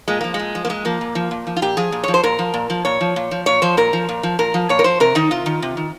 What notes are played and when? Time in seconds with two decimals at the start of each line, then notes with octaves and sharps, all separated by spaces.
0.08 A#2 G#3
0.21 F3 A#3
0.34 G#3
0.39 A#2
0.55 F3
0.65 A#3
0.69 A#2 G#3
0.85 F3 A#3
1.01 A#2
1.15 F3
1.31 A#2
1.47 F3
1.57 F4
1.62 A#2 G4
1.77 F3 G#4
1.92 A#2
2.04 F3 C#5
2.14 C5
2.23 A#2 A#4
2.39 F3
2.54 A#2
2.70 F3
2.85 A#2 C#5
3.01 F3
3.16 A#2
3.31 F3
3.46 A#2 C#5
3.62 F3 C5
3.77 A#2 A#4
3.93 F3
4.09 A#2
4.23 F3
4.39 A#2 A#4
4.54 F3
4.69 A#2 C#5
4.79 A#4
4.84 F3 C5
5.00 C3 A#4
5.15 D#3 D#4
5.31 C3 F4
5.46 D#3
5.62 C3
5.77 D#3